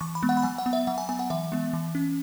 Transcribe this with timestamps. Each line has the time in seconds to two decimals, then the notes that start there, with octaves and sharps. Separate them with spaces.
0.01 E3 C#6
0.15 B5
0.23 G#3 B3
0.29 F#5
0.37 B5
0.43 F#3 G#5
0.58 F#5
0.66 B3
0.73 E5
0.87 F#3 F#5
0.98 G#5
1.09 B3 G#5
1.19 F#5
1.30 E3 E5
1.52 G#3 B3
1.73 E3
1.95 C#4